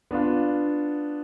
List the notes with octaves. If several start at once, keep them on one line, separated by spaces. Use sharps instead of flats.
B3 D4 F4